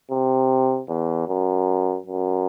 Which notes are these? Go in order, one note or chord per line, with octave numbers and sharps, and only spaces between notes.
C3
E2
F#2
F#2